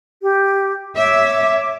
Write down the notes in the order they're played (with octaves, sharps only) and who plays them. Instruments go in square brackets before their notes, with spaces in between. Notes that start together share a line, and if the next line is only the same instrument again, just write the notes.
[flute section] G4
[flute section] C#5 D6 [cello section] E5